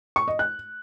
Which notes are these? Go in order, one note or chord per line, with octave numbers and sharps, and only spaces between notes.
C#6
D#5
F#6